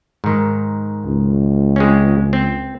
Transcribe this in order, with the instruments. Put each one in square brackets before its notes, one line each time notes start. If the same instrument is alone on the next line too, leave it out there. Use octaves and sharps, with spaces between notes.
[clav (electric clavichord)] G#2 D#3
[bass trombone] C#2
[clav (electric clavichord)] G#3 C4 C#4
C4